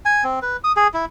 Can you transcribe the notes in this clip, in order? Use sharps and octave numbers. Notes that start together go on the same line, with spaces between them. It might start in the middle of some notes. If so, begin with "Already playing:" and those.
G#5
C4
B4
D#6
G#4
E4